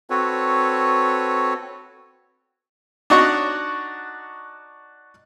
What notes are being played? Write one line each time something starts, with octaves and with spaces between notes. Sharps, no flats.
C4 F#4 A4 B4 C#5
D4 D#4 F#4 C#5 F#5 C#6